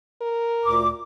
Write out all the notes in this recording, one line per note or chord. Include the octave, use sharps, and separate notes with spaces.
A#4
D2 A#2 D6